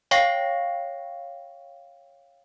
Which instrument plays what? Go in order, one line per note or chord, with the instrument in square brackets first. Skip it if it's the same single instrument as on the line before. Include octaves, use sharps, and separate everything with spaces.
[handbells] C#5 F5 G5 C#6 A#6 C7